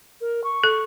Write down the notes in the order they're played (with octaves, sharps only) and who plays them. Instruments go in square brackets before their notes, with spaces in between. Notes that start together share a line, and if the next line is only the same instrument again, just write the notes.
[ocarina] A#4
C#6
[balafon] A4